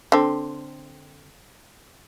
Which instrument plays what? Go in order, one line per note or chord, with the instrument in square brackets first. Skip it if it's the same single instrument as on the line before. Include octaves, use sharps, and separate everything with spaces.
[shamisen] D3 C4